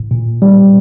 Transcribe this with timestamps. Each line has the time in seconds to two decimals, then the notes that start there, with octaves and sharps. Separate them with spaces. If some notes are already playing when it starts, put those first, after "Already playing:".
Already playing: A2
0.11 A#2
0.42 G3